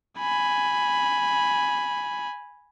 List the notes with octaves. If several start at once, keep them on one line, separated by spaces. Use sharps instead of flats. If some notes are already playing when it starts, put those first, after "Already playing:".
G#5 B5